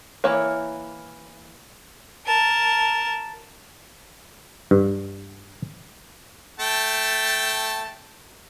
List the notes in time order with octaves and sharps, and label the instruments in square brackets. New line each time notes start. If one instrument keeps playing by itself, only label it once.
[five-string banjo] E3 A#3 E4 C#5
[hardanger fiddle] A#4 A5
[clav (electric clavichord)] G2
[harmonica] A3 G5 A5